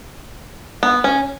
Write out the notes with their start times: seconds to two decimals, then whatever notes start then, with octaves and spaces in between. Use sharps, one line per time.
0.83 B3
1.04 C#4